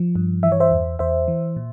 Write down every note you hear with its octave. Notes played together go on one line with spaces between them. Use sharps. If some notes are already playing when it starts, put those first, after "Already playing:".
Already playing: F3
G2
E3 E5
C#5
C5 E5
E2
E2 C5 E5
E3
A#2